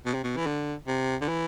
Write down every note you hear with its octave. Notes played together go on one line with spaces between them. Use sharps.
B2
C3
B2
E3
D3
C3
D3
E3